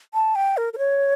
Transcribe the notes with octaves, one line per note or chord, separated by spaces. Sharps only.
A5
G5
A#4
A#4
C#5